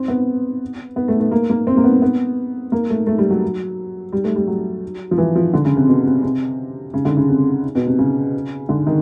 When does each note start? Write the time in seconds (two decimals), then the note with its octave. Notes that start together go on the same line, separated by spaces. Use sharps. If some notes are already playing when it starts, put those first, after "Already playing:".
Already playing: C4
0.08 B3
0.96 B3
1.08 A3
1.20 A3
1.31 A#3
1.50 A#3
1.67 C4
1.77 A#3
1.84 B3
2.02 B3
2.72 A#3
2.90 A3
3.07 A3
3.18 G3
3.31 F#3
4.13 G3
4.24 A3
4.36 G3
4.47 F#3
5.11 F3
5.18 E3
5.35 F3
5.53 D3
5.65 C#3
5.76 C3
5.88 B2
6.06 C3
6.23 C3
6.94 C#3
7.05 D3
7.17 C#3
7.28 C3
7.75 B2
7.87 C3
7.99 C#3
8.69 D3
8.87 D#3